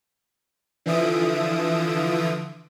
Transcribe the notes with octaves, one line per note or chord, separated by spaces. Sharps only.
D3 E3 F3 E5 D#6 D7